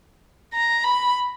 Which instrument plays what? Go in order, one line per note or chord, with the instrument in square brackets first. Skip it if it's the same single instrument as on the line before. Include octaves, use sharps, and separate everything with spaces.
[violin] A#5
B5